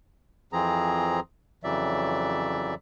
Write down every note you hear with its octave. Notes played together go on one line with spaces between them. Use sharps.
F2 E3 F3 C4 G#4 A#5
F2 C#3 E3 F#3 D5 E5